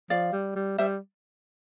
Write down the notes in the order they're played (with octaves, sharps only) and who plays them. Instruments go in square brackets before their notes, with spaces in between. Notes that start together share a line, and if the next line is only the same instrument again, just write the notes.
[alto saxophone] F3 [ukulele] D5 F5
[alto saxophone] G3
G3
[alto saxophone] G3 [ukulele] C5 E5